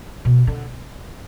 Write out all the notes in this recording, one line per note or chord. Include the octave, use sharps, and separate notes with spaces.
B2
D3